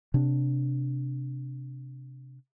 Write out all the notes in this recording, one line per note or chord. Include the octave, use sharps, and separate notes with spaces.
C3 D4